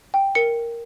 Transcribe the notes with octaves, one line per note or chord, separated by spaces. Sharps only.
G5
A#4 C#7